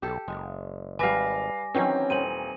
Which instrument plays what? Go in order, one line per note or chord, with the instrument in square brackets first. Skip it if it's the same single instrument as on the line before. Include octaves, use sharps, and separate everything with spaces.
[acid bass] B1 [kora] G4 A4
[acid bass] F#1 [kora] G#3
[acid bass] G#1 [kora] G3 E5 [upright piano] B4 F5 [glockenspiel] G#5 D6 A#6
[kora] D#3 E3 F#3 [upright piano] C4 [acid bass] C#4
[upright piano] D#1 [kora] C4 [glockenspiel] D#7 F#7